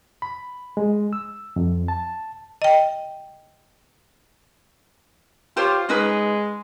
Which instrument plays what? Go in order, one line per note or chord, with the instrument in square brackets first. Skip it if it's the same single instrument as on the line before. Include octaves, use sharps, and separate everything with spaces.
[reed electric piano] B5
G#3
E6
F2
A5
[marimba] D#5 G5
[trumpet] F4 [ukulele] G4 C5 C#5
[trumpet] G#3 [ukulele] C#4 D#4 B4